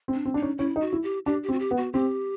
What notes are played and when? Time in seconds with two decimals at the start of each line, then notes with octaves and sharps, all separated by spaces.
0.08 C4
0.14 D4
0.25 C4
0.34 D4 D#4
0.42 C#4
0.58 C#4 E4
0.76 D#4
0.81 F#4
0.93 E4
1.03 G4
1.26 D4 G4
1.43 G4
1.49 C4
1.52 F#4
1.59 G4
1.71 B3
1.77 F#4
1.93 C4 G4